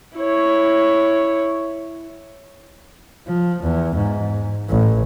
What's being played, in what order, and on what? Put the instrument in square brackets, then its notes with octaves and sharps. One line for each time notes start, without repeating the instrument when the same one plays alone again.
[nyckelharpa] E4 C#5
[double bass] F3
E2
G#2
A1